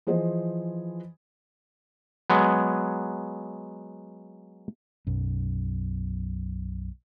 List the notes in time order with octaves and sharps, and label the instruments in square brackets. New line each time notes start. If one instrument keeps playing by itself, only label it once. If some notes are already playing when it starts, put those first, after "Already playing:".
[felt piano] E3 F3 G#4 C5 D#5
[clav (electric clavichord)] F#3 G#3 B3
[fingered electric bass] B1 F#2